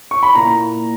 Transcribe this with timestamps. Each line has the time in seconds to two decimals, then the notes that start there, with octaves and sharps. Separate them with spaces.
0.11 C#6
0.23 B5
0.35 A#2 A#3 E4 A#5